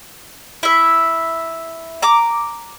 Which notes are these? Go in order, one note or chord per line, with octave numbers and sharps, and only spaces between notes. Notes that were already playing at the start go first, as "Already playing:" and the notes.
E4 E5
A#5 D6